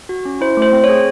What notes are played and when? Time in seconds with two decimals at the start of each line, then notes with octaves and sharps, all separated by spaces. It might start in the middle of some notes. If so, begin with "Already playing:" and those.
0.09 F#4
0.25 C#4
0.41 E4 C5
0.57 A3
0.62 C5
0.73 C4
0.84 C#5
0.89 G#4